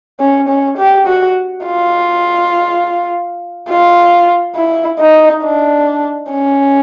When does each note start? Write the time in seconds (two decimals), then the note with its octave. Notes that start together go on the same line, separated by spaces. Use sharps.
0.20 C#4
0.48 C#4
0.78 G4
1.07 F#4
1.65 F4
3.69 F4
4.56 E4
5.00 D#4
5.43 D4
6.31 C#4